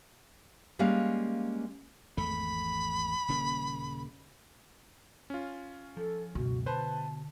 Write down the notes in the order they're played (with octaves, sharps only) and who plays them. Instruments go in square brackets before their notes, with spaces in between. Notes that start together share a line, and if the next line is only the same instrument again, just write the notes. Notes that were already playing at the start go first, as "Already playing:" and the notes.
[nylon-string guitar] G3 G#3 A#3 C#4 F5
[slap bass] G#1 E2 A3 [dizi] B5
[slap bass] D#1 C#3 A#3
[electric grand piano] C#4 F4
[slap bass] F3 [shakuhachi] A4
[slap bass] C#2 F#2 [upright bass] B2 [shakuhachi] F#4
[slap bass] D3 [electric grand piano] B4 C5 [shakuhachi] A5